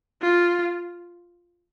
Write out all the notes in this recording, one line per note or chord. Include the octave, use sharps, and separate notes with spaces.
F4